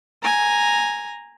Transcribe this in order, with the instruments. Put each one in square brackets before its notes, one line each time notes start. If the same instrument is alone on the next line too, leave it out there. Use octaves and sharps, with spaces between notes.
[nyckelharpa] G#5 A#5